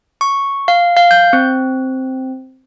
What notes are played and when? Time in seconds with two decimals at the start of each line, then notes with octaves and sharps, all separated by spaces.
0.21 C#6
0.68 F5
0.97 F5
1.11 G6
1.33 C4